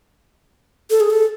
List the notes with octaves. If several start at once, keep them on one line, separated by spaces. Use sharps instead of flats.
A4
G#4
A4